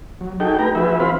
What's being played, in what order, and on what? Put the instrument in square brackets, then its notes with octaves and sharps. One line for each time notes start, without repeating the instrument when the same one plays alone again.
[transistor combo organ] F#3
D#4 F#4 G#4 A4 G5
A3 B4 G5 A#5
F3 F#4 G#4 B4 E5
E3 C4 F4 C5 F5 B5